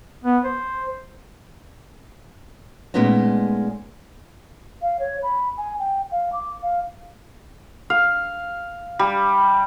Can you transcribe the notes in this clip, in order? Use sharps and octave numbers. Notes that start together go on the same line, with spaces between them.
B3
C5
A#2 G#3 A3 B3 C#4 D#4
F5
C#5
B5
G#5
G5
F5
D6
F5
F5
G3